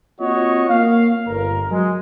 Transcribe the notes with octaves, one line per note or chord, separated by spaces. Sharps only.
A#3 C4 F4 F#4 C#5 D#5
A#3 F5
G1 A#4
F#3 G#3